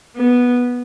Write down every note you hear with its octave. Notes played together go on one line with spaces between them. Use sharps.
B3